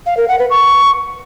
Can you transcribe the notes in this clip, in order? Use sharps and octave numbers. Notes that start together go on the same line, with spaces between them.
F5
A#4
F#5
B4
C#6